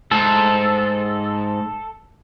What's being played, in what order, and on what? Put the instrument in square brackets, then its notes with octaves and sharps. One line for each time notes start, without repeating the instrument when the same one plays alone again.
[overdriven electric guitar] G#2 [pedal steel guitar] A4